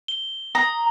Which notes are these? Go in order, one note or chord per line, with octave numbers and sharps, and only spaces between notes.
G7
A#5 D#6